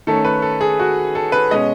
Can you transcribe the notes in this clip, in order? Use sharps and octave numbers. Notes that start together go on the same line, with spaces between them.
D#3 A3 C#4 A4
B4
A4
G#4
F#4
A4
B4
B2 G#3 C#4 D#5